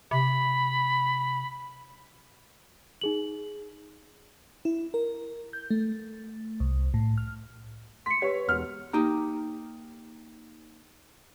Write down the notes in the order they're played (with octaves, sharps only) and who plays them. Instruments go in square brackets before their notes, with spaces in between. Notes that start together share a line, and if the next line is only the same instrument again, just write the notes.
[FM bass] C3 [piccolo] B5
[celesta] D#4 G#4 F#7
[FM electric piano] E4
A#4
G6
A3
C2
A2
F6
[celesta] C6 C#7 [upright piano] B6
[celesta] G4 B4 [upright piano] C#5
[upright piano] E1 F6
[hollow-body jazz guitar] A#3 D#4 G4 A#5